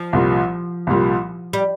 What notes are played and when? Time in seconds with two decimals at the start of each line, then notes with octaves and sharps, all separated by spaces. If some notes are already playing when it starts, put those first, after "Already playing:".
Already playing: F3
0.13 C2 A#2 G3
0.87 C2 A#2 G3
1.53 G3